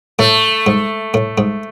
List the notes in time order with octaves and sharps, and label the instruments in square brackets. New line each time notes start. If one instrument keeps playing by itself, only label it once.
[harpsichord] A2 [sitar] A3
[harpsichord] G#2
A2
G#2